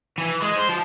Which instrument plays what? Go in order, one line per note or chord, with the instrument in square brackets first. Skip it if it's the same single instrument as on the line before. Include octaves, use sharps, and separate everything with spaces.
[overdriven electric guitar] E3
G#3
C5
F3